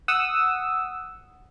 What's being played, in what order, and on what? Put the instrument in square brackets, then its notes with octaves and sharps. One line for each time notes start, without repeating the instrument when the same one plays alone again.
[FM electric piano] F#5 D#6 E6